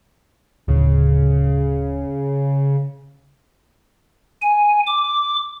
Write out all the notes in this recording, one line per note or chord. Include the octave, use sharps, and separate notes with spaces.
D1 C#3
G#5
D6